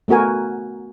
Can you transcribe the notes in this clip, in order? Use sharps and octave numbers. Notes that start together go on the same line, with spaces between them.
A3 B3 F#4 A#4 G#5